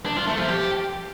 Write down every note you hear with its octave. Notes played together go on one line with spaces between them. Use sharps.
D4
F4
A3
F3
G4